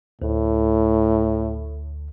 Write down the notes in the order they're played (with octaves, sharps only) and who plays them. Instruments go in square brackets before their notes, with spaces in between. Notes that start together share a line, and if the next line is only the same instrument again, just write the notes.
[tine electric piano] D2 [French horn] A2